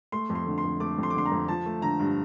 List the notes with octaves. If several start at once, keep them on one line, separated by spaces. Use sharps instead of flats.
A3 C6
F2
C6
D3
C6
F2
A3 D6
F2
C6
D6
D3 C6
A#5
F2
F3 A5
A3
D3 A#5
G2